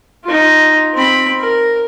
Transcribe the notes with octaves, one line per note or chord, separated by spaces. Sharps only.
D#4 F4
C4 B5
A#4